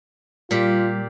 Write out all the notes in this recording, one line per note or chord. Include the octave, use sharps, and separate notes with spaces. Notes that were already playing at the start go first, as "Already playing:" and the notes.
A#2 G3 F4 G4